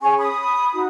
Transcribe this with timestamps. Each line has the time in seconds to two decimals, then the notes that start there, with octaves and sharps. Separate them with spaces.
0.01 C#4 G#4 C#5 G#5 C#6
0.19 B5 D#6
0.72 D#4 F#4